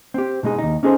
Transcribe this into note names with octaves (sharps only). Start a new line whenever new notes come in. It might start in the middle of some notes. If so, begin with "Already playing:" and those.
C4 G4
B2 G#3 D#4 G#4
D#2 D#4
C#4 D#4 G#4 A4 C5